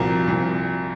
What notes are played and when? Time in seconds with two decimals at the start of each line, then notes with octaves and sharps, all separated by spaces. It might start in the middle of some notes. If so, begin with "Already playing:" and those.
Already playing: C2 A#2 F3 F#4 A#4
0.28 C2 A#2 F3